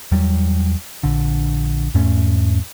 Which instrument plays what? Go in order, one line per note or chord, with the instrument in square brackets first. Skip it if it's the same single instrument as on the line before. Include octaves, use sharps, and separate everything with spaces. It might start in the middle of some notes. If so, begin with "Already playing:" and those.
[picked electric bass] E2 F#3 G3
A#1 D3
E2 G#2 A3 C#4